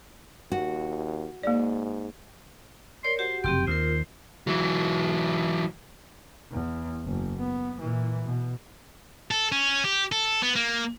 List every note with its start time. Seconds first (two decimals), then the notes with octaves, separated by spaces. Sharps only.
0.52 D#2 F#4
1.43 G#2 A#3 D5
3.04 A#4 C#5 D5 C6
3.19 F#4 G4 C5 F#5
3.44 F1 F#2 C#3 C4 G4 G5 C6
3.67 D#2 D#3 F4 A#4 C5
4.47 E3 F#3
6.52 E2
7.06 F#1
7.39 B3
7.81 A#2 E3
8.26 B2
9.31 A4
9.52 C#4
9.84 G4
10.12 A4
10.42 B3
10.56 A#3